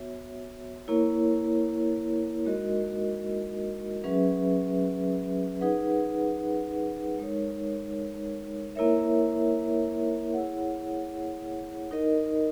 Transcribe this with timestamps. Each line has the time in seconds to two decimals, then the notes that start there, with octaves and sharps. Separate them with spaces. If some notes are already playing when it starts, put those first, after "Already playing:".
Already playing: B3 F#4 C#5 E5
0.88 A#3 E4 A#4 C#5
2.45 G#3 D#4 F#4 A#4 D#5
4.04 F#3 C#4 G#4 B4 E5
5.61 D#4 G#4 B4 F#5
7.18 G#3 D#4 A#4 C#5
8.75 A#3 E4 A#4 C#5 E5
10.33 E4 G#4 C#5 F#5
11.91 D#4 A#4 D#5